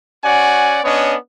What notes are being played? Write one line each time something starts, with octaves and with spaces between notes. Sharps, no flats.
C#4 F#4 D5 F#5 G#5
B3 C#4 D4 C#5 D#5